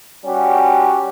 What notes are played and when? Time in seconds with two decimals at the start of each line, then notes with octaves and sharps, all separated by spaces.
0.25 G3 C#4 F#4 G4